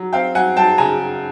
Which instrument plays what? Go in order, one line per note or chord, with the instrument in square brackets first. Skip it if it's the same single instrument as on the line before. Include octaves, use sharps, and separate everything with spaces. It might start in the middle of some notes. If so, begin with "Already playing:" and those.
Already playing: [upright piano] F#3
C4 F5 G5
F#3 F#5 G#5
F#3 G5 A5
C#3 G#5 A#5